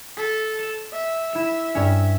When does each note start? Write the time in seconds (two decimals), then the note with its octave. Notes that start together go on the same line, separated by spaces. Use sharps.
0.17 A4 B6
0.59 E7
0.93 E5
1.33 E4 E7
1.75 G2 C#4